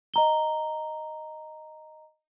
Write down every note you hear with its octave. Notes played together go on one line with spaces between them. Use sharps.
D#5 A#5 G7